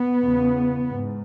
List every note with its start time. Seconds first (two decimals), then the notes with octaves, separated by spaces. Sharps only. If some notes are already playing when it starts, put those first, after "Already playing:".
Already playing: B3
0.22 E2 C#3
0.85 G#2